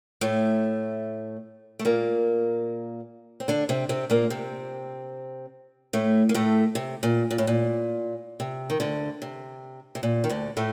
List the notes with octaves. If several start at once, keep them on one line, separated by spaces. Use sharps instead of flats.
A2 A3
A3
A#2 A#3
C4
D3 D4
C3 C4
C3 C4
A#2 A#3
C3 C4
A2 A3
A#3
A2 A3
C3
A#2
A#2
A2
A#2
C3
D#3
D2 D3
C3
C3
A#2
D#3
D2 D3
A2 A3